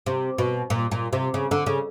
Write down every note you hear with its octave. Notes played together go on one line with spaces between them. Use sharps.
C3
B2
A#2
A#2
C3
C#3
D3
C#3